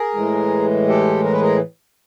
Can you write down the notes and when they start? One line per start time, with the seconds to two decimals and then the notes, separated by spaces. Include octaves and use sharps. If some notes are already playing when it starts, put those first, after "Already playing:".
Already playing: G#4 A#4
0.14 A2 E3 G#3
0.88 G4 A4
1.24 A#4
1.33 B4
1.41 G#4 A#4